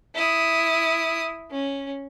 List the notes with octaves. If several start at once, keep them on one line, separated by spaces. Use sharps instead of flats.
E4 D#6
C#4